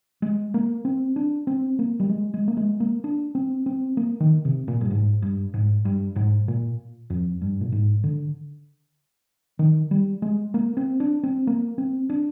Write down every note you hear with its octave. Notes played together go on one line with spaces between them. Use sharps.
G#3
A#3
C4
D4
C4
A#3
G3
G#3
G#3
A#3
G#3
A#3
D4
C4
C4
A#3
D#3
C3
A#2
G2
G#2
G2
G#2
G2
G#2
A#2
F2
G2
A#2
G#2
D3
D#3
G3
G#3
A#3
C4
D4
C4
A#3
C4
D4